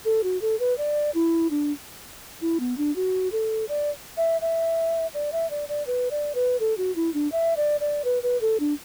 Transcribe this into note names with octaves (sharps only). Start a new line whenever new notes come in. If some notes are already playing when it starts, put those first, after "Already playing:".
A4
F#4
A4
B4
D5
E4
D4
E4
B3
D4
F#4
A4
D5
E5
E5
D5
E5
D5
D5
B4
D5
B4
A4
F#4
E4
D4
E5
D5
D5
B4
B4
A4
D4